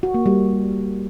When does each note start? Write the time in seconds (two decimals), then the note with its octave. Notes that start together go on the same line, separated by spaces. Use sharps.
0.03 F#4
0.14 A#3
0.26 G3